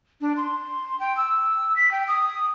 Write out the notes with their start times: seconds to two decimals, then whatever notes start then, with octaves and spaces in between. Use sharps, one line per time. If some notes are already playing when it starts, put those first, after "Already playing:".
0.21 D4
0.37 C6
1.00 G5
1.17 E6
1.76 B6
1.91 G5
2.08 D#6